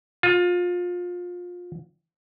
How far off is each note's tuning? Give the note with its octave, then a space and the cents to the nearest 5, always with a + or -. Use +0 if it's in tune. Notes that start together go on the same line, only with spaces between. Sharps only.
F4 +25